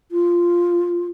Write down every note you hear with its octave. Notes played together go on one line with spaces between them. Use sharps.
F4